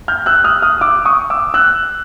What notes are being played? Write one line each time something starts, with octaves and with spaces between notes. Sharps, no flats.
F6 G6
E6 F#6
D#6 F6
D#6 F6
D6 E6
C#6 D#6
D6 E6
E6 F#6